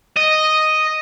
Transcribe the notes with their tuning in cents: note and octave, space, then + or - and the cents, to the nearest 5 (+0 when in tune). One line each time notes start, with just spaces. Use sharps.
D#5 +0